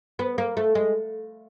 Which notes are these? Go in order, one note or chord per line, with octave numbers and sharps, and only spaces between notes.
B3
A#3
A3
G#3